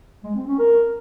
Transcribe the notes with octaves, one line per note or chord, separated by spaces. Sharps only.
G#3
C4
C#4
A#4